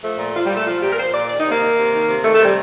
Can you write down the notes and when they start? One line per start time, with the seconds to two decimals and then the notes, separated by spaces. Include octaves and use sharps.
0.03 F3 A3
0.18 A#2
0.34 F3 F4
0.45 G3
0.50 A#2
0.56 A3
0.66 F3 F4
0.81 A#2 G4
0.92 A#4
0.98 F3 C5
1.13 A#2 D5
1.29 D#3 D5
1.40 D#4
1.45 C3 A#3
1.61 D#3
1.77 C3
1.93 D#3
2.08 C3
2.24 D#3 A3
2.34 A3
2.39 C3
2.44 G3